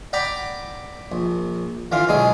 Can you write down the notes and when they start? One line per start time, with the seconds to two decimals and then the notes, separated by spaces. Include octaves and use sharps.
0.13 D5 F#5 G5 A#5 B5 D6
1.12 A#1
1.92 D3 E3 F4 F5
2.09 B2 D3 F#3 G#3 G#4